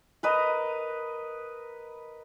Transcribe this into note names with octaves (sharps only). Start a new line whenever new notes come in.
A#4 B4 D#5 A#5